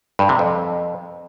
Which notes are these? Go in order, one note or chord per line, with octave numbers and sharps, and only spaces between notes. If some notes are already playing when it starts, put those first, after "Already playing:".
G2
C3
F2